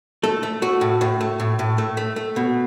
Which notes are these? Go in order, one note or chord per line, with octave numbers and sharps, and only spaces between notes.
A3 A4
A3
A3 F#4
A2
A2
A3
A2
A2
A3
A3
A3
B2